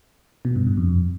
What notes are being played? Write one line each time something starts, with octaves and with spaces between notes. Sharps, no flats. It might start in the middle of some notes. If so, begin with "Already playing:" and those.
B2
G2
G2
F2